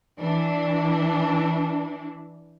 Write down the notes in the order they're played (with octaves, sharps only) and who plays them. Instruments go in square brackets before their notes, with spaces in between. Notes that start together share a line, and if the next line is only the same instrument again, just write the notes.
[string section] E3 D4